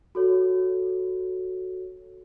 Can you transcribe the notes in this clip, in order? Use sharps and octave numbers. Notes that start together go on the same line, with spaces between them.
F#4 A4 C#5